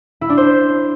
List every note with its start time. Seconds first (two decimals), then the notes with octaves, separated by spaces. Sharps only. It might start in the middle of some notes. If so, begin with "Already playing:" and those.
0.21 E4
0.29 D4
0.38 C5